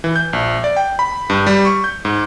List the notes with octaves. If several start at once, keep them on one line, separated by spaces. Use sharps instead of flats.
E3
G6
A#1
D5
G5
B5
G2
G3
C#6
G6
G#2